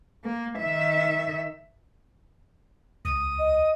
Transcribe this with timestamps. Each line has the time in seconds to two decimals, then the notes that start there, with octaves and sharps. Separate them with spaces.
0.24 A#3
0.59 D#3 E5
3.05 C#2 D#6
3.39 D#5